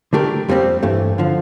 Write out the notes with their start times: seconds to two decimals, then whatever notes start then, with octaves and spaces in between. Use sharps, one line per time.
0.13 D3 A3 D4 G4 A#4
0.48 F2 C3 G3 C4 G4
0.83 G2 E3 A3
1.18 D3 F3